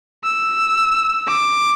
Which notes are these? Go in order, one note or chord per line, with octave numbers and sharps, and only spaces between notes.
E6
D6